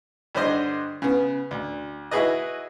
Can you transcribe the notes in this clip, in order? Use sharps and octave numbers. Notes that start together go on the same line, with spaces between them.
G2 D3 C5 D#5 C6
C#3 B3
D2
E4 F#4 G#4 B4 D#5